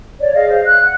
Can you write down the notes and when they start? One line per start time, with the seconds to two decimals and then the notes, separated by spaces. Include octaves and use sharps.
0.20 C#5 D5
0.34 G#4 D#5 F5
0.49 C5 F5
0.64 F#6
0.84 F#5